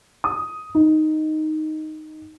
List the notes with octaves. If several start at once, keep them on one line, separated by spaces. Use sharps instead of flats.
D#6
D#4